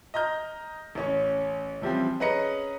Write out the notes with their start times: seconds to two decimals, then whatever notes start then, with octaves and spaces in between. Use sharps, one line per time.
0.14 D#5 A#5 F6 G6
0.95 A1 C#4 C#5
1.82 E3 F3 G3 C4
2.20 C#4 G#4 B4 D#5 A#5 C#7